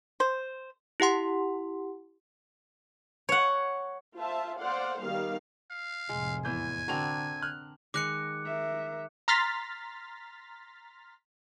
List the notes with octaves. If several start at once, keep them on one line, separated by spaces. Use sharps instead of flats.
C5
E4 G4 F#5 C6
C#5 F#5
F4 C5 E5 A5
C5 D5 F5 F#5
D#3 G3 B3 G4 F5
F5
F1 A2 G#3
E2 E3 G#5 G6
D3 C4 D4 F#4 A#4 F7
F6 F#6
D#3 G#3 D6 F#6 C#7
A#4 E5
A#5 C6 F6 A6 B6